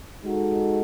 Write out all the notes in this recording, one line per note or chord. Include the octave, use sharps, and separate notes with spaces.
G#3 D#4 F#4 A4